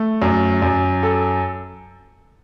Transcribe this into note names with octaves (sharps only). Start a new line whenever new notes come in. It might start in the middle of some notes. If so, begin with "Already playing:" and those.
Already playing: A3
F#2
F#2
A4